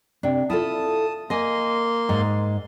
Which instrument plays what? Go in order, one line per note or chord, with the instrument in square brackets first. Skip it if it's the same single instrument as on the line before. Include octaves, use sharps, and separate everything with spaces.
[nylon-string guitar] C3 D4
[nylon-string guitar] E4 F4 A4 [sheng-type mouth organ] A5 D#6
[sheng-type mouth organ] A#3 C6 [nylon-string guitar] D#5 G#5
[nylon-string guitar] G#2